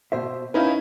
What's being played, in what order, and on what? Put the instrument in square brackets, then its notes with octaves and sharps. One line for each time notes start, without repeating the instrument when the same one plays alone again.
[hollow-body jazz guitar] B2 C5 E5
[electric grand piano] C#4 D#4 E4 [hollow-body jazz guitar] B4 F5